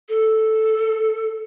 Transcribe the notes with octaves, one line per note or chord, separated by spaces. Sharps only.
A4